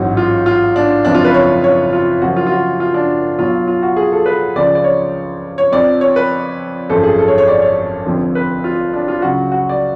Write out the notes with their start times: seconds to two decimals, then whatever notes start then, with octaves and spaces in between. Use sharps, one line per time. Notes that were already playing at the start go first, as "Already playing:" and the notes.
Already playing: A1 G#2 F#3 F#4
0.17 F4
0.46 F4
0.76 D4
1.05 F#1 F2 F3 D4
1.15 F4
1.25 B4
1.34 C#5
1.64 C#5
1.93 F4
2.21 F#1 F#2 F3 F#4
2.36 F4
2.47 F4
2.51 F#4
2.80 F4
2.94 D4
3.39 B1 B2 F#3 F4
3.68 F4
3.82 F#4
3.96 G#4
4.12 A4
4.26 B4
4.55 C#2 C#3 F3 D5
4.75 D5
4.84 C#5
5.58 C#5
5.72 F2 F3 D5
6.01 C#5
6.16 B4
6.90 G#1 F#2 F3 A4
7.03 G#4
7.19 A4
7.28 C#5
7.38 C#5
7.48 D5
7.62 C#5
8.06 F1 F2 D3 F3
8.35 B4
8.64 F4
8.93 D4
9.08 F4
9.22 C#2 C#3 F#3 F#4
9.52 F#4
9.69 D5